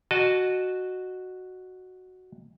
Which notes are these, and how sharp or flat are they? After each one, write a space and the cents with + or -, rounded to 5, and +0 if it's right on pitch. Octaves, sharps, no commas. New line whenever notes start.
F#4 +0 D#5 -25 A5 -20